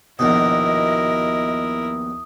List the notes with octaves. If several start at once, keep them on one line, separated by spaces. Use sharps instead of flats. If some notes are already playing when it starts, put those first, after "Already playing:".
A#1 D#2 B2 E4 A#4 D#5 D#6